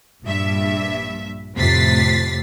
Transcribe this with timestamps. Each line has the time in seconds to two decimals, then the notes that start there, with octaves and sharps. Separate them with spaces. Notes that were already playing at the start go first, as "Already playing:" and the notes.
0.23 A#1 G2 E5
1.57 F2 A2 C3 A6 B6 C7